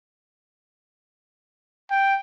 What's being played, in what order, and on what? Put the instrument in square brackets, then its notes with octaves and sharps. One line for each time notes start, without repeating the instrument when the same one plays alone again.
[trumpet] G5